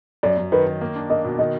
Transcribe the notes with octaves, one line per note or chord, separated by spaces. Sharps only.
F#2 D5
F#2
D#3 B4
D#3
A#3
D4
A#3 D#5
B2
D#3 D#5